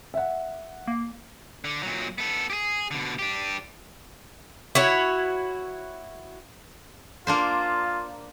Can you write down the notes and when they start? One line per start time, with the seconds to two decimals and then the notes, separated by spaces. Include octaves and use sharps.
0.14 E5 F#5
0.88 A#3
1.64 D3
1.83 A#2 F#3
2.18 B3 A4
2.50 G4 G#4
2.91 B2 D3
3.19 D4 G4
4.75 E4 F#4 C#5
7.27 A#3 D4 F4 C5